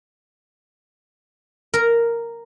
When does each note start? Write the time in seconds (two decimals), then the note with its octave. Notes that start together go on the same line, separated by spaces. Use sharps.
1.74 A#4